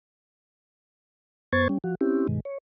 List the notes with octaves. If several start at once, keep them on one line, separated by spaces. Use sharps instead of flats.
F#2 B3 C5 C#6 G#6 A6
G3 C#4
F3 F#4
C4 C#4 E4 G4
G2 B2 D#3 G#3
C#5